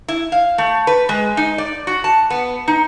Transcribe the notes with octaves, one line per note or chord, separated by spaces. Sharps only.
E4
F5
A3
B4
G#3
D#4
D5
F#4
A5
B3
D#4